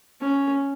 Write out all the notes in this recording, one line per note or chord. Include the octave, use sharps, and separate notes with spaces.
C#4